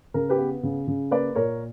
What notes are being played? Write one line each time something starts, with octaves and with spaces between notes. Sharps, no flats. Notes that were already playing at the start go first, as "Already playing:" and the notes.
C#3 A#4
G4 B4
B3
C#3
C#3
A#3 B4 D5
A#2 A#4 C#5